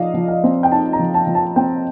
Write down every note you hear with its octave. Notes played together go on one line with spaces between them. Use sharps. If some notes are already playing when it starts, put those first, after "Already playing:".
Already playing: F3 D#4 D5 D#5 F5
F3
F5
C4
G5
D#4 A5
A#5
F3
A5
F3
A5
C4 G5